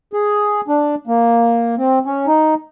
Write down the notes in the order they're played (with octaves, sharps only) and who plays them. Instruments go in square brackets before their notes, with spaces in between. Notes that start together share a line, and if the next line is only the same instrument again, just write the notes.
[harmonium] G#4
D4
A#3
C4
C#4
D#4